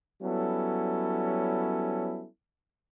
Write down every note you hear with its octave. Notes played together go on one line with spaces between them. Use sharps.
F#3 G3 B3 C#4 E4 A4